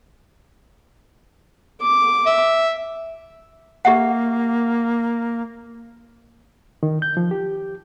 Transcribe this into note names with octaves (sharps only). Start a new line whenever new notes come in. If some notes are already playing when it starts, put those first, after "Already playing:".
D6
E5
A#3 G4 E5 F#5
D#3
G6
F3
G4